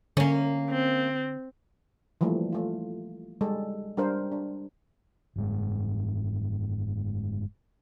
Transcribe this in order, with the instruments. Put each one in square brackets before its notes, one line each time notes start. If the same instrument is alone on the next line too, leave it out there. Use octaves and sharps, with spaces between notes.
[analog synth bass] D3 [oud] A#3 C#4
[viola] C4
[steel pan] E3 F3 G3 A3 A#3
A3 F4
G3 G#3 A4
G3 D4 A#4 C5
D4
[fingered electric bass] F#1 G#2 G#3